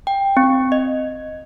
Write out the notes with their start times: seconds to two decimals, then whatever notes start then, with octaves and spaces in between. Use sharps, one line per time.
0.07 G5
0.37 C4
0.72 D#5